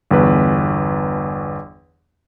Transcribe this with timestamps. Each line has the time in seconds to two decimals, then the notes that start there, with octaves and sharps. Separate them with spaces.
0.11 G1 E2 B4